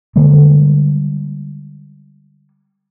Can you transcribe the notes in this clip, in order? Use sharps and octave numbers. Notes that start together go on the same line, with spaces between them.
D3 G3 G#3 A#3